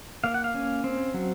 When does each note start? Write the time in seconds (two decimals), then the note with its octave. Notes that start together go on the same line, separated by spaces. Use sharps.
0.24 A#3 F5
0.34 F#5
0.44 F5
0.54 C#4
0.84 C4
1.14 F#3